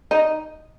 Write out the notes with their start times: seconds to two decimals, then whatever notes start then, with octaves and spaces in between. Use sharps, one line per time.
0.11 D#4